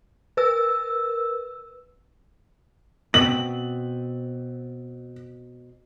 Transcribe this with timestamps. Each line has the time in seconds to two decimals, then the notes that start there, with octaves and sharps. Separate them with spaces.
0.37 A#4 B4 E6
3.14 B2 C4 F#7